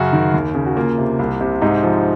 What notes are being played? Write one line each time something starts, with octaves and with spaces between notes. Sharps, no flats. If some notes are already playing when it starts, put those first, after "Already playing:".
Already playing: F#2 C#3 F#4
D#3
D#2
C#3
F#4
A#3 F4
C3
C2
C3
G#2 D#4
F3